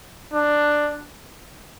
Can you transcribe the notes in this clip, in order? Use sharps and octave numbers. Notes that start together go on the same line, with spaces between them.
D4